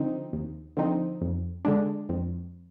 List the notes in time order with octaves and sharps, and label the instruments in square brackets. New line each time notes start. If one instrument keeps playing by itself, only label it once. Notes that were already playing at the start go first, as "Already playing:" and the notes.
Already playing: [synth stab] D3 F3 C4 D#4
D#2
D3 F3 C4 D#4
F2
D3 G#3 D4
F2